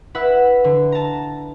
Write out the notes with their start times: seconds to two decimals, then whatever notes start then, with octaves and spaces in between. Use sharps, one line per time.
0.15 E4 B4 E5 F#5 E6
0.64 D3
0.92 A5 A#5